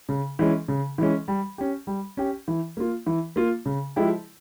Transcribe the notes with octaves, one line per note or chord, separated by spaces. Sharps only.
C#3
E3 G#3 C#4
C#3
E3 G#3 C#4
G3
C#4 G4
G3
C#4 G4
E3
A#3 F4
E3
A#3 F4
C#3
F3 G#3 E4 G4